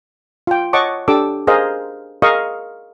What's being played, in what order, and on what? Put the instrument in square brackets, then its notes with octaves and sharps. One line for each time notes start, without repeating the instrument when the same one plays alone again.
[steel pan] F4 G5
C#5 D#5 F#5 A5 C#6 D6
D4 G4 A4 D6 E6
G#4 A#4 C5 D#5 F5
G#4 A#4 D#5 F5 C#6 D#6